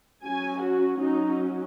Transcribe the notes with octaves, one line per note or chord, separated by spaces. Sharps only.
F#3 C#4 G#5
F#4
F#3 C#4 D#4